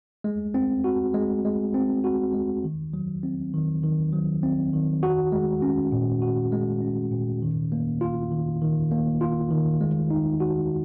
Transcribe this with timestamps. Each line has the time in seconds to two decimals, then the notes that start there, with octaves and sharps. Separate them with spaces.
0.24 G#3
0.54 C4
0.84 F#4
1.14 G#3
1.45 G#3
1.74 C4
2.04 F#4
2.34 G#3
2.64 D#3
2.93 F#3
3.23 C4
3.54 D#3
3.83 D#3
4.13 F#3
4.43 C4
4.73 D#3
5.03 F#4
5.32 G#3
5.62 C#4
5.92 A#2
6.22 F#4
6.52 G#3
6.82 C#4
7.11 A#2
7.42 D#3
7.72 A#3
8.01 F4
8.31 D#3
8.62 D#3
8.91 A#3
9.21 F4
9.51 D#3
9.81 G#3
10.10 D#4
10.40 F#4